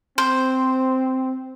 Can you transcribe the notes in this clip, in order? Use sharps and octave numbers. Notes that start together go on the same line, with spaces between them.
C4 C5